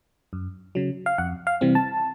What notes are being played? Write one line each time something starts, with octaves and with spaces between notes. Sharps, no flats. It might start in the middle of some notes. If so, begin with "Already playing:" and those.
F#2
C#3 F#3
F5
F2 F#5
F5
C3 E3 G3 C4
A5